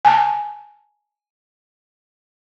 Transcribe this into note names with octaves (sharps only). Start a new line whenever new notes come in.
G#5 A5